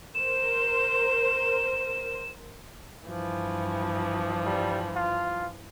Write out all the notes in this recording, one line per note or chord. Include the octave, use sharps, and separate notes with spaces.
A#4 C5 E7
G2 E3 F3
G3
F4